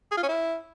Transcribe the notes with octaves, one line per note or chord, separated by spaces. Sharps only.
G#4
F4
C#4
E4